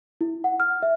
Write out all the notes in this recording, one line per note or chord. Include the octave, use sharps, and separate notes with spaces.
E4
F#5
F6
E5